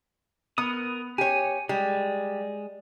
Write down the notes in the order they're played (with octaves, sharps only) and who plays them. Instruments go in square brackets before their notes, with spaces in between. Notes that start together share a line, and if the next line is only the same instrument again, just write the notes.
[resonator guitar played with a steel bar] B3 [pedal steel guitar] A#4 D#6
[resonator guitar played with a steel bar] G4 C#5 [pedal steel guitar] G#5
[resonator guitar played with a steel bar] G3 [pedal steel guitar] G#3